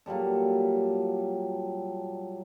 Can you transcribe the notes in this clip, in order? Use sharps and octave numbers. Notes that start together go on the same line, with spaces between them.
A#2 F#3 G3 A4